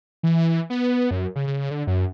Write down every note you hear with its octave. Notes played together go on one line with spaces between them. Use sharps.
E3
B3
F#2
C#3
C#3
D3
F#2